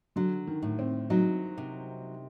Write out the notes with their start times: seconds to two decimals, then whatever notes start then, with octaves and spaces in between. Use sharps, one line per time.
0.16 D3 F#3
0.47 D#3
0.62 A2
0.79 C4
1.10 F#3 D#4
1.58 C3